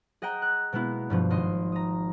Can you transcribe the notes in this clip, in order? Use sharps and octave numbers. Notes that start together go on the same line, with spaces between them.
G#4 D#5 F#5 G5 A#5
F#6
B2 G#3 A#3 B3 E4
G2 B2 F3
G#1 D#5 C6
A#5 D#6